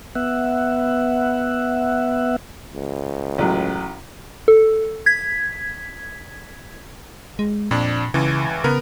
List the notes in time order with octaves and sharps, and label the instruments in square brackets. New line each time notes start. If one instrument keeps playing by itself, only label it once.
[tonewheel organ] B3 E5 F#5
[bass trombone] C#2
[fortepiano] A1 F#3
[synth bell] A4
G#6 B6
[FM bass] G#3
[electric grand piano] F2 D4 [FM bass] A#2
[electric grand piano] C#2 E3 [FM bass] C#3
[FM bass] C#3 [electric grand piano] B3 A#4